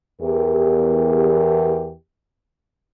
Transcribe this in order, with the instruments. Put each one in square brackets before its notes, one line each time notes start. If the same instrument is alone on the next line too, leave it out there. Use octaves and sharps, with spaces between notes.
[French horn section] E2 G4 A#4